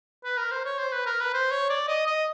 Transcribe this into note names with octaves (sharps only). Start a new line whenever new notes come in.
B4
A#4
C5
C#5
C5
B4
A#4
B4
C5
C#5
D5
D#5
D#5